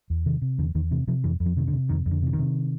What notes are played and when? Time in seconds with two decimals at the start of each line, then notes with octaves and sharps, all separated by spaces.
0.10 E2
0.26 C3 D#3
0.42 C3
0.58 E2 D3
0.75 E2 D#3
0.91 C3 E3
1.07 C3 F3
1.24 F2 E3
1.40 F2
1.46 F3
1.57 C3 D#3
1.68 D3
1.73 C3
1.89 F2 D#3
2.06 F2
2.11 D3
2.22 C3 E3
2.33 D#3
2.39 C3